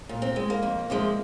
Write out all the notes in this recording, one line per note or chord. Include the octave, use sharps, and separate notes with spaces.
A#2
C4
G#3
A#3
F2
C3 F3 G#3